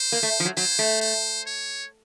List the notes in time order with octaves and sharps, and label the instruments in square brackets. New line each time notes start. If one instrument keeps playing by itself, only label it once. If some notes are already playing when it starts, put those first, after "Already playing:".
Already playing: [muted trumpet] C5
[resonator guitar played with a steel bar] A#3
A3
F3
F#3
[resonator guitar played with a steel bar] F#3 [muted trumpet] C5
[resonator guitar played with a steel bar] A3
[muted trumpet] C5
C#5